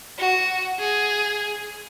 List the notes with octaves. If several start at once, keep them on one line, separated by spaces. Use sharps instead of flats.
F#4
G#4